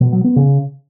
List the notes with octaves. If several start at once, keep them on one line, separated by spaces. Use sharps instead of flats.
B2
F#3
B3
C#3